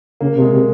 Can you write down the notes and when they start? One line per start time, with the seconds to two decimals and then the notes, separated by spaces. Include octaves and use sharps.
0.21 C#3 A#3
0.36 C3
0.42 G#3
0.52 C3